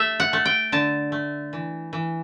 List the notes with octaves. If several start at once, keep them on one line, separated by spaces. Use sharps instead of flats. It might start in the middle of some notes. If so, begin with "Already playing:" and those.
Already playing: A3 E5
F#5
A3
G5
D3 A5
A3
E3
E3